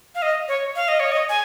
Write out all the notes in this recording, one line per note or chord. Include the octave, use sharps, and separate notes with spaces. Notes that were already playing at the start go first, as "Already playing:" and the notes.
F5
D#5
C#5
F5
D#5
C#5
D#5
G#5